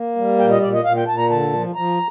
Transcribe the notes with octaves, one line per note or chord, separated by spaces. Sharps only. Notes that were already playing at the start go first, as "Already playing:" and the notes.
Already playing: A#3
G3
A#2 G5
D#5
A#2 D5
D#5
A#2 F5
G5
A#2 A5
A#5
D3 A5
F3
F3 A#5